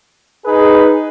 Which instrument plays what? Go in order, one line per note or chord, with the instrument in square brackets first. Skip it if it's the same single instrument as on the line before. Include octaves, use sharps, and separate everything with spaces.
[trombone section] D#4 G#4 B4